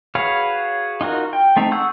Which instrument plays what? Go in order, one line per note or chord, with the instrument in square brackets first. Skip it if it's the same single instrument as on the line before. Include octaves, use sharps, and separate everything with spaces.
[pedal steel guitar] F#4 G#4 B4 C#5 F5
D#4 F4 F#4 A#4
G5
A3 C4 D#4
G#4 F#5 C#6 E6 G6